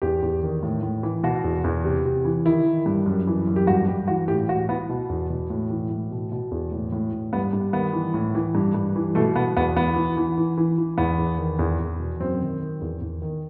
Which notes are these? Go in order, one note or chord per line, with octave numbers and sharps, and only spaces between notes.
E2 G4
E2
D#3
A2
A2
E3
B2 F#4
E2
E2
C3
C3
E3
D#3 E4
D#3
G2
F#2
E3
F#2
G4
G2 F#4
G2 G4
E3 F#4
A2 G4
A2 F#4
E3 B3
B2
E2
B2
A2
E3
A2
B2
B2
E2
A2
A2
A2
G2 B3
G2
D#3 B3
E3
A2
E3
G2
G2
E3
B2 A3
B2 B3
E2 B3
E3 B3
E3
E3
E3
E3
E3
E2 B3
E2
D#3
E2
E2
B2
F#2 C4
D#3
D#3
E2
E2
D#3